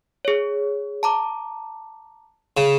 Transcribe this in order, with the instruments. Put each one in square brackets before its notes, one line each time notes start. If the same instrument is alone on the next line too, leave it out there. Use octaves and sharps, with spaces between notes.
[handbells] G#4 C#5
A5 A#5 D6
[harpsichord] C#3